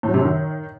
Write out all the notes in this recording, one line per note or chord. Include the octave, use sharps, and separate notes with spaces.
A2
F#3
C3
F#2
D#3